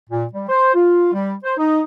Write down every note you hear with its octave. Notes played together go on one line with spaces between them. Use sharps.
A#2
G3
C5
F4
G3
C5
D#4